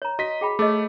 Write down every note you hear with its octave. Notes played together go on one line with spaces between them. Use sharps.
C#5 A#5
F#4 D#5 B6
G#4 G5 B5
A3 G#4 C#5 D#5